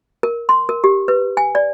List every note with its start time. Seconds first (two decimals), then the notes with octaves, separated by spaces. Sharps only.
0.23 A#4
0.49 C6
0.69 A#4
0.84 G4
1.08 B4
1.37 G#5
1.55 D5